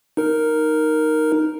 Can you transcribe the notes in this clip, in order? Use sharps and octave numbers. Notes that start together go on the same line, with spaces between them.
D#4 A#4